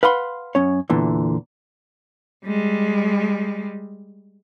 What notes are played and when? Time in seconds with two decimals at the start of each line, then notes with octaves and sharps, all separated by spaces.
0.03 B4 F5 F#5 B5 C6
0.55 F#2 C#4 C#5
0.90 E2 A#2 D3 E3
2.45 G3 G#3